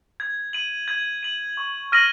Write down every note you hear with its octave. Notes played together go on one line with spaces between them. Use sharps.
G#6
D#7 F#7
G#6
D#7 F#7
C#6
F6 A#6 D#7 F#7